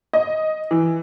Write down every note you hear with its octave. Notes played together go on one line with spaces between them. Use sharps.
D#5
E3